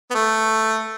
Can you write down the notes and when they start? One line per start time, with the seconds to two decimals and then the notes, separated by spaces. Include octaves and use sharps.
0.10 B3
0.14 A3